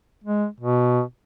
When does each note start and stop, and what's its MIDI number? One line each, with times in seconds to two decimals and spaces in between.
0.24 0.46 56
0.60 1.02 47